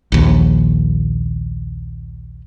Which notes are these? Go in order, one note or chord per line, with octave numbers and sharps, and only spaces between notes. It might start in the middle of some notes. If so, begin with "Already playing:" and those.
A#1 D#2